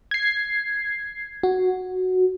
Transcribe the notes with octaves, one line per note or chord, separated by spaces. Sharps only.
G#6 C7
F#4